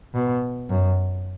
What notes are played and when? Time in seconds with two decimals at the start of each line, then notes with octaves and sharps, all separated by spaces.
0.14 B2
0.70 F#2